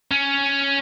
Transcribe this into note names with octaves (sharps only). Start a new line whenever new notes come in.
C#4